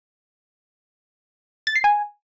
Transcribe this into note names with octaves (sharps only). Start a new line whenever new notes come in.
A6
C7
G#5